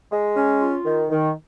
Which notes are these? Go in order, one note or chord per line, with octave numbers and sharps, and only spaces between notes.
G#3
C#4
F4
D#3
D#3